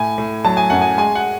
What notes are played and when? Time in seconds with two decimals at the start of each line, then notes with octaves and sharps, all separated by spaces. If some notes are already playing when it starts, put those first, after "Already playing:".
Already playing: A2 G#5
0.18 A2
0.45 F#3 A5
0.57 G#5
0.70 F#2 F#5
0.81 G#5
0.97 G#3 G#5
1.15 F#5